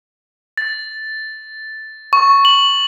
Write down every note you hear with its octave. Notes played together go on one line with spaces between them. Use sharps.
A6
C#6
F#7